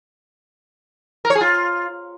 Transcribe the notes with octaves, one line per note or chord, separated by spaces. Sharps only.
A#4
C#5
G#4
F4